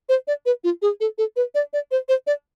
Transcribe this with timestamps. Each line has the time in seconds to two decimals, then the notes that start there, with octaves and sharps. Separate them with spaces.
0.09 C5
0.27 D5
0.46 B4
0.64 F4
0.82 G#4
1.00 A4
1.18 A4
1.36 B4
1.55 D5
1.73 D5
1.91 C5
2.09 C5
2.27 D5